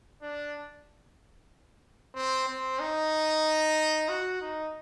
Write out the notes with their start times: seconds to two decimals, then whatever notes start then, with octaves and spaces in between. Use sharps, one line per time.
0.22 D4
2.15 C4
2.48 C4
2.79 D#4
4.08 F#4
4.41 D#4